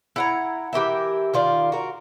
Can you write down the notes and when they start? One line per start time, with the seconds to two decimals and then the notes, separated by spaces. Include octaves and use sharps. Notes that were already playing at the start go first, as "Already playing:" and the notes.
0.16 E4 F#5 A#5
0.73 E3 G4 A#4 E5
1.34 D#3 F4 D5
1.72 F#4 A#4